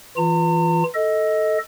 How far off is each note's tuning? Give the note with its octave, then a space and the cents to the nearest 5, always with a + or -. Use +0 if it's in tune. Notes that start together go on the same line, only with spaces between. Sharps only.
E3 +0 F4 +0 A#5 -45
A4 +0 D#5 +15